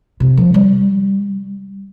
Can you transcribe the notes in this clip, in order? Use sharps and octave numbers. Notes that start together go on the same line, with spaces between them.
C3
F3
G3